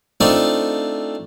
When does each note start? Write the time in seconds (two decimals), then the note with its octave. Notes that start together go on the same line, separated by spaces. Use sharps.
0.21 A3 C4 D4 D#4 F4 A4